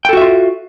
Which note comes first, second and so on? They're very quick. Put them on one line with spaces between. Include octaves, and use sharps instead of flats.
G5 A4 F#4 E5 F4